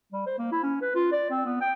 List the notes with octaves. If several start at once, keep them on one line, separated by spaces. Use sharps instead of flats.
G3
C5
A#3
E4
C#4
B4
F4
D5
C4
B3
G5